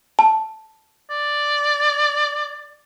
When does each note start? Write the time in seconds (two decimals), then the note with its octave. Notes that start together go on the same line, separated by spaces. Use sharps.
0.19 A5
1.10 D5